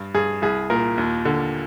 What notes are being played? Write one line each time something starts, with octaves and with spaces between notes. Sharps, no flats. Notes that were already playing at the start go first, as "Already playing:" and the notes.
Already playing: G2
G2 G#4
C2 G#4
A#2 A#4
D#2
D3